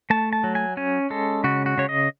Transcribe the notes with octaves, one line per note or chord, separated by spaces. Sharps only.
A3 A5
A5
F#3
G#5
C#4 G#5
G#3 A4
C#3 F#4
F#4
C#3 C#5
D#5